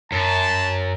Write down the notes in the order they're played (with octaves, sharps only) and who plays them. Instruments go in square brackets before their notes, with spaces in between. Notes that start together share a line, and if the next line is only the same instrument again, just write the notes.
[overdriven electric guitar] F#2 [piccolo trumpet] A5